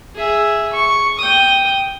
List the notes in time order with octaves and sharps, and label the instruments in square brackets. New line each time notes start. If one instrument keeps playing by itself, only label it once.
[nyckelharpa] G#4 E5
C#6
G5 D#6